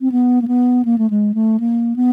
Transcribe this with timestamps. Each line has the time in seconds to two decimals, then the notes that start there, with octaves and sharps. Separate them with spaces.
0.01 C4
0.12 B3
0.42 A#3
0.48 B3
0.85 A#3
0.98 A3
1.10 G#3
1.34 A3
1.60 A#3
1.96 B3